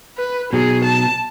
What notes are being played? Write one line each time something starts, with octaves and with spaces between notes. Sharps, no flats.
B4
B2 F#3 B3 G#4
A5